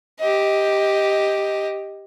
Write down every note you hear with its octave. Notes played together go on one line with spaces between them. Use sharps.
G4 D#5